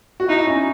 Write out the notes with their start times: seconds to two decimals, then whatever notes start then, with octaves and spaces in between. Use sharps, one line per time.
0.20 F#4
0.28 D#4 E4
0.47 C#4